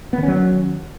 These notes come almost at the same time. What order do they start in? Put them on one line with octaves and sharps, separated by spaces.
B3 D#3 C#4 F#3